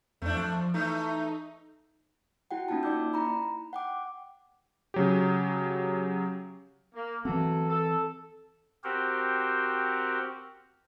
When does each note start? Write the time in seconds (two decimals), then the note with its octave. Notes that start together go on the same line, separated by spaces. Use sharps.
0.22 F2 A3 D4
0.35 F3
0.74 E3 A3 D#4
2.51 E4 F#4 F#5 G5
2.68 A#3 C#4 D#4 F4 G5 A5
2.83 A#3 D#4 D5 D6 E6 G6
3.13 E4 A#5 B5
3.73 F#5 G5 D6
4.94 C#3 F#3 G4
6.95 A#3
7.25 E3 F#3 A3 C4 A4
7.69 A4
8.84 C4 F#4 G4 A#4 C5